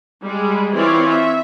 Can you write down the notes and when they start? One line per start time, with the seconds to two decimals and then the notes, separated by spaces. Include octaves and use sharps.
0.23 G3 G#3
0.75 E3 C4 F4 C#5 D5
1.09 E5